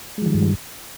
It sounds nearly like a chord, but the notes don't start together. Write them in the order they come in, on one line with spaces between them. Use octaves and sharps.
G#3 F3 D#3 G3 G2